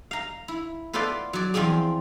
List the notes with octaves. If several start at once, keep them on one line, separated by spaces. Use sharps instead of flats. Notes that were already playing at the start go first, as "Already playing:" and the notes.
F5 A#5
E4
B3 F4 A4 B4 C5 D5
F#3 D5
E2 F3 C4 F4 G#4